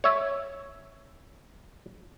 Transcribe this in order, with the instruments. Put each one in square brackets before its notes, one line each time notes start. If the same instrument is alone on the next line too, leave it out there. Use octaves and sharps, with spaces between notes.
[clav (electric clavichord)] C#5 E5